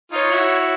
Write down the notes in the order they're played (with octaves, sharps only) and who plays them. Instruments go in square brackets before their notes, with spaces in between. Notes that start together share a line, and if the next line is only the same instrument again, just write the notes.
[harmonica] D#4 F4 [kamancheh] C#5
[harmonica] E4 F#4